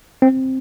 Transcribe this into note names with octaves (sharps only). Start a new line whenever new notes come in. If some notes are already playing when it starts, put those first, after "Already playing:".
C4